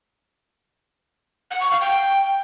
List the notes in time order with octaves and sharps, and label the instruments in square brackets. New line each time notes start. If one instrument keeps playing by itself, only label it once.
[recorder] F#5
C#6
F5
G5